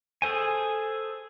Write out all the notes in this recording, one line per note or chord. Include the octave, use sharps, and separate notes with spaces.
G#4 A4 C5 G#5